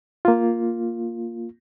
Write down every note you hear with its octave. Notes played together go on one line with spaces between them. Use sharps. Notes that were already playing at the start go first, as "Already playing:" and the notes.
A#3 F4